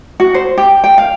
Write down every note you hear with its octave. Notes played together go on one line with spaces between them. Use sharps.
F#4
C5
G4
G5
F5